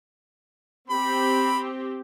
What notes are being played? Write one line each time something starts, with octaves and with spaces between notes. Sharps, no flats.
C4 G4 B5